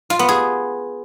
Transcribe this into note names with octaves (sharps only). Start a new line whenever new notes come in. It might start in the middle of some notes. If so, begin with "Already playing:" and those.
F4
B3
G#4